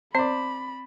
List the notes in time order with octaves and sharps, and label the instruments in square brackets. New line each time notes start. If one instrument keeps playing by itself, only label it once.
[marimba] C4 [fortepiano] C5 D5 [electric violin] B5